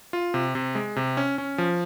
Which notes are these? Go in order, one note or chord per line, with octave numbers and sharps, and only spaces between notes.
F4
C3
C3
G#3
C3
C#4
C#4
F3